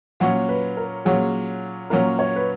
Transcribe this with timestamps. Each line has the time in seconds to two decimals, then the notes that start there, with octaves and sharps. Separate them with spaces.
0.20 A#2 F#3 C#4 F#5
0.49 B4
0.77 A#4
1.05 A#2 F#3 C#4 G#4
1.90 A#2 F#3 C#4 A#4
2.19 C#5
2.36 B4